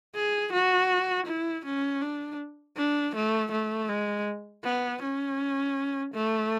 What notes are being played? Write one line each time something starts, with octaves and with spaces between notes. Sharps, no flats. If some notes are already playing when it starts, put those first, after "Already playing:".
G#4
F#4
E4
C#4
D4
D4
A3
A3
G#3
B3
C#4
A3